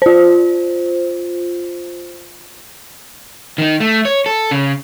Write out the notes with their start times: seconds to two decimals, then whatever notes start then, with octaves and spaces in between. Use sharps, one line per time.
0.02 F4 C5
3.58 D#3 D#4
3.80 A3
4.05 C#5
4.26 A4
4.51 C#3